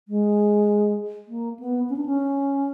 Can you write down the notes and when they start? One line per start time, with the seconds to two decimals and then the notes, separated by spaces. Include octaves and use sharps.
0.08 G#3
1.28 A#3
1.59 B3
1.89 C#4
1.96 D4
2.06 C#4